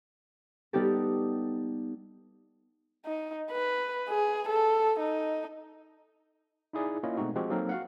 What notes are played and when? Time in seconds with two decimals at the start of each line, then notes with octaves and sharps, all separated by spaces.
0.73 G3 B3 D#4 G4 A4
3.06 D#4
3.51 B4
4.09 G#4
4.49 A4
5.00 D#4
6.73 D#4 E4 G#4 D5
7.03 A#3 C#4 E4 F4 C#5 D#5
7.17 B2 G#3 A3 C4 D#4 F#4
7.36 F3 G#3 C4 F#4 G4
7.50 F#3 A#3 C4 D#4 A4 A#4
7.69 F#4 F5 F#5